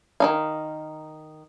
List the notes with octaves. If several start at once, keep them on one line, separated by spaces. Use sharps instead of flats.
D#3 D#4 F5